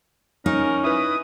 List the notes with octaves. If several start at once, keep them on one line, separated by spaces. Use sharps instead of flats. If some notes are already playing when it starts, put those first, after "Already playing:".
C#4 D#4 A#4
E4 B4 D#6